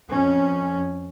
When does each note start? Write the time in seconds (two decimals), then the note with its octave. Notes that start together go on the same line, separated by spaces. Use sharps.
0.10 F2 C#4